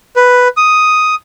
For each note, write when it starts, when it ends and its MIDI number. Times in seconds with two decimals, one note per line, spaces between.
0.16 0.48 71
0.57 1.15 87